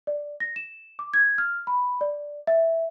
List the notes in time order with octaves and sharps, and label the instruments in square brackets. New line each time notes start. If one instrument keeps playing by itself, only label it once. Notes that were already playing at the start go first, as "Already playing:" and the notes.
[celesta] D5
A#6
E7
D6
G#6
F6
B5
D5
E5